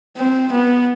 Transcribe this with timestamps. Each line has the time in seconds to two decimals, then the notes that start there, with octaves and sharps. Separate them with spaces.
0.17 C4
0.52 B3